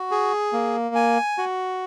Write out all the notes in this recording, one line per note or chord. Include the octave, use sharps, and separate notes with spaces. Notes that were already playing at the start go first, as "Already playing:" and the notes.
Already playing: F#4
G#4
A#3
G#5
F#4